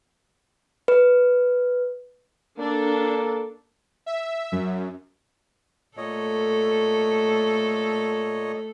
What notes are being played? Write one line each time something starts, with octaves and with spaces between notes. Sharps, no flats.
B4
A#3 D4 A4
E5
F#2
A#2 A3 A4 C#5 D#5